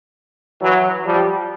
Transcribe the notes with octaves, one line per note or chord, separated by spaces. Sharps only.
E3 F#3
F3 G3